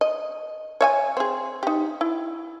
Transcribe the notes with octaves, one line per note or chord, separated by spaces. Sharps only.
D#5
C#5 E5 G#5
C4 G#4
D#4 G4
E4